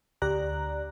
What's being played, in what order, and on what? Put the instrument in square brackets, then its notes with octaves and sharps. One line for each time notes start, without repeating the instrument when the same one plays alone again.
[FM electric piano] D2 G4 D5 A#5 F#6